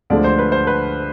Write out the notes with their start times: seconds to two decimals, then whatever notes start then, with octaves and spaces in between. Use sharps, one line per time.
0.10 D2 D3 F3 G#3 D5
0.24 C5
0.39 B4
0.52 C5
0.67 B4